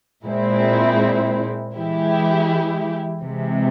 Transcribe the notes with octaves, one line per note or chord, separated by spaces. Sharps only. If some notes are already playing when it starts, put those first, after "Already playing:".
A#2 G#3 C4 E4
E3 G#3 E4 G4
C3 E3 G#3